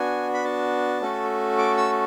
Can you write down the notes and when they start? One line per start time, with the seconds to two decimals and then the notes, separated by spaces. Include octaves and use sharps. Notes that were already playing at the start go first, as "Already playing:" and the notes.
Already playing: B3 D4 F#4 G#5
0.34 B5
0.44 A5
1.02 A3 C#4 F#4 A4
1.58 D6
1.77 E6